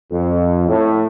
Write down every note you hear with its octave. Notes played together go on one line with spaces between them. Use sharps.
F2
A2